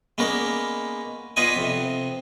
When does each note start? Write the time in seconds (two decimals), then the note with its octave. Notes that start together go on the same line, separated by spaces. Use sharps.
0.18 G#3 A#3 B3 C#4 A#4 D5
1.36 B3 F4 B4 D5 D#5 G#5
1.56 F2 C3